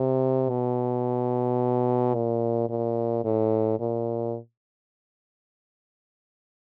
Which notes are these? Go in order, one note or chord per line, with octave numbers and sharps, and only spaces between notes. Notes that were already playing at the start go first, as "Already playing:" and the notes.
Already playing: C3
B2
A#2
A#2
A2
A#2